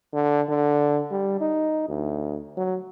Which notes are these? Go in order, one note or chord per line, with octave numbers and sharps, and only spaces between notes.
D3
D3
G3
D#4
D2
F#3